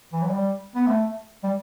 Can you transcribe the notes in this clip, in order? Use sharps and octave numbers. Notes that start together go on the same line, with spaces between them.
E3
F#3
G3
B3
A3
G3